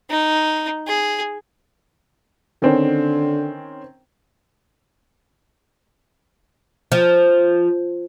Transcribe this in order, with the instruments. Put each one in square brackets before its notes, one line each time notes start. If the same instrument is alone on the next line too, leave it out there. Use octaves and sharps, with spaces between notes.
[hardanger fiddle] D#4
G#4
[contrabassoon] D3 [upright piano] D#3 C4 C#4
[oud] F3